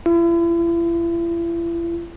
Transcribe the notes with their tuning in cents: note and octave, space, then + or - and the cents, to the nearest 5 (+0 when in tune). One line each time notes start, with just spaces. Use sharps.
E4 +40